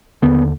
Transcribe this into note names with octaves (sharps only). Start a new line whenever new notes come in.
D#2 D3 B3